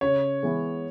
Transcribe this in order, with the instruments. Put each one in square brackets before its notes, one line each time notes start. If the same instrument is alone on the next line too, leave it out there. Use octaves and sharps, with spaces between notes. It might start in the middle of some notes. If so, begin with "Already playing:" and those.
[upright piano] C#3 [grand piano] C#5
[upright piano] E3 G#3 B3